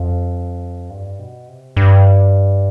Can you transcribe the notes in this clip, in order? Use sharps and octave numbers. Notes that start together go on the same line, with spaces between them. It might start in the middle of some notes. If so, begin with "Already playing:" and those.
Already playing: F2
G2
B2
C3
G2